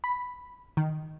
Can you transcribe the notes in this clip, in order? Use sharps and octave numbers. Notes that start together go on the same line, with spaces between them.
B5
D#3